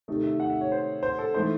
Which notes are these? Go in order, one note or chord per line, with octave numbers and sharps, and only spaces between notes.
C3 D#3 A3 D#4
E5
F#5
E5
C#5
C5
C5
A4
E3 A3 D#4 C5